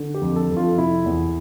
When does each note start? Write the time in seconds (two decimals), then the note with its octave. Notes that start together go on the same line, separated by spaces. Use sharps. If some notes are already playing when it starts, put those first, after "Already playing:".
Already playing: D3
0.14 G4
0.21 F2
0.36 A4
0.50 F2
0.57 F4
0.78 C3 E4
1.06 E2